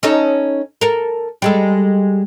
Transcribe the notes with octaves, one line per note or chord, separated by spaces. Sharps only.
C#4 D#4 A4
A4 A#4
G3 G#3 A4